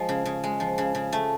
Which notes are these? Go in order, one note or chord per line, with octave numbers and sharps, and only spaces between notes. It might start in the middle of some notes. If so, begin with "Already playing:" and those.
Already playing: F3 G#3
C#3
C#3
G#3
F3
C#3
C#3
A3